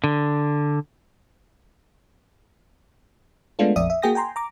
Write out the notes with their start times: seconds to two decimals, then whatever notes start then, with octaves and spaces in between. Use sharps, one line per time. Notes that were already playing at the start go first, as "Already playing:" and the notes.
0.04 D3
3.59 G#3 A3 B3 D4 F4 A4
3.76 A#1 F2 D5 E5 D#6
3.90 E5
4.02 A#3 F#4 G#4 G5 D#6 A#6
4.15 G5 G#5 A#5 C6
4.36 A#5 D6